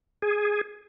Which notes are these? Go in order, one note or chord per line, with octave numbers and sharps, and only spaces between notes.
G#4